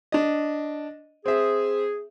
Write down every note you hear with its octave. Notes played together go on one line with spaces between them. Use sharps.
D4 D#5
C4 G#4 E5